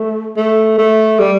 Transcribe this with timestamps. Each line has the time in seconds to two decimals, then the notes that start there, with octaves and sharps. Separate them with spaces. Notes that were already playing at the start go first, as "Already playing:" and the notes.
Already playing: A3
0.36 A3
0.78 A3
1.19 G3